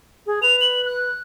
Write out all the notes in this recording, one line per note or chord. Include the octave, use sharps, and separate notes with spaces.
G#4
B4 F7
F#7
F#6